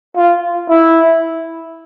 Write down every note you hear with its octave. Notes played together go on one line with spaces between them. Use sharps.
F4
E4